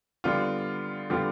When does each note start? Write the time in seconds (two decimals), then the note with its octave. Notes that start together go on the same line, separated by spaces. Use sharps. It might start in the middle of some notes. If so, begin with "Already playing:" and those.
0.24 D3 G3 B3 F4
1.10 D3 G3 B3 F4